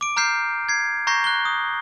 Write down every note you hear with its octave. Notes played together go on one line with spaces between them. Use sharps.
D6 D7
A#5 F6 G6 C7
G#6 C7
A#5 C#6 G6 A#6 C7
F#6 G7
D#6